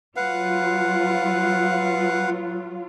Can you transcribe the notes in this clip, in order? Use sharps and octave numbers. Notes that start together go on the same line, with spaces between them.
F#3 F4 B4 F5 F#5